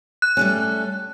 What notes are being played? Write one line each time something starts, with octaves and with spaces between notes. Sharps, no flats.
F#6
G3 A3 C#4